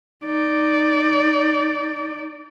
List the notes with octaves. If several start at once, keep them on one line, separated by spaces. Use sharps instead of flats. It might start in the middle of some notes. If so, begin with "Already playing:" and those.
D#4 D5